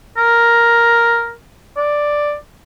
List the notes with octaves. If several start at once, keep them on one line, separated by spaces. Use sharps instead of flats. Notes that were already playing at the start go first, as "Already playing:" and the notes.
A#4
D5